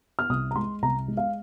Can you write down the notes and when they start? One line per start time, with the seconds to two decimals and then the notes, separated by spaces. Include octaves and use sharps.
0.19 F6
0.29 C2 D#6
0.51 A#5
0.56 G#3 C6
0.82 C2 A#5
1.08 G#3
1.17 F5